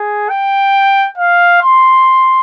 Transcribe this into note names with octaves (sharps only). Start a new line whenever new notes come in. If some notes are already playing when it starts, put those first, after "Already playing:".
Already playing: G#4
G5
F5
C6